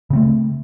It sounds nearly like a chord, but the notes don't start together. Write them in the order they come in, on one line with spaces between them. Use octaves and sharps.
C#3 C4 A3